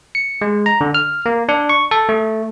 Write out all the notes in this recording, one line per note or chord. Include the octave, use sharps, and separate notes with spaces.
C#7
G#3
A#5
D3
F6
A#3
D4
C#6
A4
A3